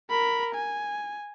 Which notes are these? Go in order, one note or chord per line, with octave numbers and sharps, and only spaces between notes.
A#4 B5
G#5